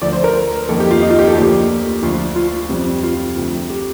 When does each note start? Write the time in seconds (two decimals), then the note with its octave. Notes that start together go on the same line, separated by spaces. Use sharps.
0.02 D2 D3 F3 D5
0.13 C5
0.24 A#4
0.69 F2 D#3 A#3 A4
0.80 G4
0.91 F4
1.02 D#4
1.10 F4
1.19 G4
1.28 A4
1.36 D2 D3 F3 A#3 G4
2.03 D2 D3 F3 F4
2.36 F4
2.69 F2 C3 G3 C4
3.03 F4
3.36 D2 C3 F3 C4
3.70 G4